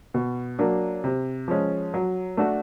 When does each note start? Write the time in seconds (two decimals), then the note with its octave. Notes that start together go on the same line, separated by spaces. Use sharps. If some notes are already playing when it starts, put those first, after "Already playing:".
0.14 B2
0.59 F#3 A#3 D4
1.04 C3
1.48 F3 G#3 C#4
1.94 F#3
2.37 A3 D4 F#4